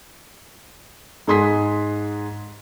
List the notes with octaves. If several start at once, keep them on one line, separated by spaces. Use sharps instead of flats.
G#2 G#4 C6 D#6 B6